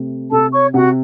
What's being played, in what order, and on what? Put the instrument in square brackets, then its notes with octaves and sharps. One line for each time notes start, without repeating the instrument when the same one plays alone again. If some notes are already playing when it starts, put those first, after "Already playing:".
Already playing: [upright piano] C3 A3
[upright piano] C3 [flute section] A4 A5
[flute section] C#5 C#6
[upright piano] C3 [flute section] F#4 F#5